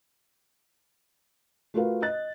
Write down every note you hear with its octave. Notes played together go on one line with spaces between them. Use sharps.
A3 F4 F#4 A#4 B4 F5
D#5 F#6 A6